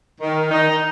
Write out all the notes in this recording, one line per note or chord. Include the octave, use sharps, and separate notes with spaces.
D#3
D#4